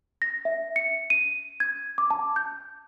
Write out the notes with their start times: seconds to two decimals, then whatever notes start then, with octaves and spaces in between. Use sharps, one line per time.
0.22 A#6
0.45 E5
0.76 C#7
1.10 D#7
1.60 G#6
1.98 D6
2.11 A5
2.36 G6